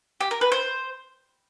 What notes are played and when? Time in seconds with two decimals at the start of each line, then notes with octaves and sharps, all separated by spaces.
0.21 G4
0.31 A#4
0.41 B4
0.52 C5